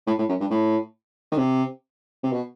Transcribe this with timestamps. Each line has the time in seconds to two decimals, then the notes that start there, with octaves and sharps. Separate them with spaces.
0.07 A2
0.19 A2
0.29 F#2
0.40 G2
0.51 A2
1.32 D#3
1.37 C3
2.23 C3
2.33 B2